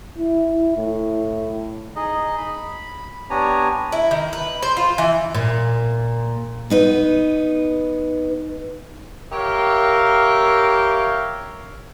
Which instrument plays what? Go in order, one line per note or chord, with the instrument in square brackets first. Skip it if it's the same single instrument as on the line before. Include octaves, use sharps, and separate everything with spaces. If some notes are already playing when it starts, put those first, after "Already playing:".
[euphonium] E4
A2
[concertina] D#4 G#4 D#5
B5
B3 D4 G4 C#5 G#5 A#5
[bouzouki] E4
D#3
B4
C5
F4
E3
[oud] A#2
[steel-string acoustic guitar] B3 D#4 B4
[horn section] G4 A#4 C#5 E5 F5 G5